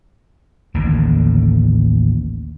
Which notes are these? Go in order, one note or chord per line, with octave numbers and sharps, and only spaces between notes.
A1 D#2 A2 D3